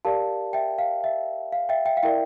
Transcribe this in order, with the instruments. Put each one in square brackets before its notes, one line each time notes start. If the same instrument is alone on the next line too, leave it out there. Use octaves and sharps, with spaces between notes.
[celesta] G4 A#4 D5 F5 A5
E5 G5
F5
E5
F5
E5 G5
E5 G5
F5
E4 A#4 D5 E5 G5